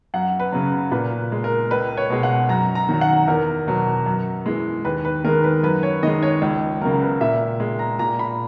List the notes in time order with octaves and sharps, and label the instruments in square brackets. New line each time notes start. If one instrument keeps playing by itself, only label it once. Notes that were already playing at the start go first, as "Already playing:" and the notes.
[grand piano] F#2 F#5
B4
C#3 F#3
A#2 B4
G#3
A#4
C#2 B4
C#5
B2 G#3
F#5
F#2 A#5
A#5
D#3 F#3
F#5
E2 A#4
B2 F#3
F#2
E3 G#3
D#2 B4
B4
D#3 G#3 A#4
B4
F#2 B4
C#5
D#3 G#3 D#5
C#5
C#2
C#3 F#3 A#4
B4
A#2 E5
G#3
A#5
A#2 A#5
B5